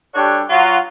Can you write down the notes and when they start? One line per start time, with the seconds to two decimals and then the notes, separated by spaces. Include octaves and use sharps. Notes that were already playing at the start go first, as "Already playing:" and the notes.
0.15 G3 D4 F#4 G4 A4 C#5
0.50 F#3 F4 F#4